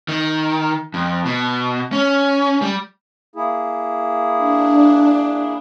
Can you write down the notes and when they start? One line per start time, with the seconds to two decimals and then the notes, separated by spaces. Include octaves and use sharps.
0.08 D#3
0.94 F2
1.26 B2
1.92 C#4
2.62 G3
3.36 A#3 E4 G#4
4.36 D4